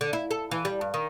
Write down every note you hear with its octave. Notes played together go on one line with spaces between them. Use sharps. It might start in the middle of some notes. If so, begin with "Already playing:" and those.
D3
E4
A4
E3
G3
G2
D#3